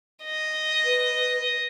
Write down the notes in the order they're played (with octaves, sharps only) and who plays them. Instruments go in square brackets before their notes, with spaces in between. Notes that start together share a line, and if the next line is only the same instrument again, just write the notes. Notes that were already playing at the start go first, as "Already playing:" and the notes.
[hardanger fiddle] D#5
[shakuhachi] B4